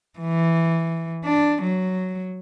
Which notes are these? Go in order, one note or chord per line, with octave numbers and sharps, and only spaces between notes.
E3
D4
F#3